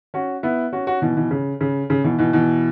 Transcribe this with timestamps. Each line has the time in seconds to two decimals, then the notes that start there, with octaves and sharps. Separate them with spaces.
0.14 C#4 F#4
0.43 B3 E4
0.73 C#4 F#4
0.87 C#4 F#4
1.02 B2 E3
1.17 B2 E3
1.31 C#3
1.61 C#3
1.90 C#3
2.04 B2 E3
2.19 B2 E3
2.33 B2 E3